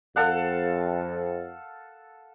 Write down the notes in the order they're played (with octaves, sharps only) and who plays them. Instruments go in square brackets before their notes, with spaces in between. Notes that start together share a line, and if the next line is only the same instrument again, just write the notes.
[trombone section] F2 [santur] A4 F5 F#5